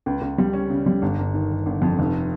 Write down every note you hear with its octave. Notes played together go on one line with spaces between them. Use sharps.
C#2
C#2
G3
C#4
C#3
G3
G1
G1
D#3
D#3
G1
F2
F1